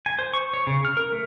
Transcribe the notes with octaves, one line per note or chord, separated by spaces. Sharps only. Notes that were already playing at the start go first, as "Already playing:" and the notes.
G#5
C5
C#6
C#5
C#3
F6
A#4
A3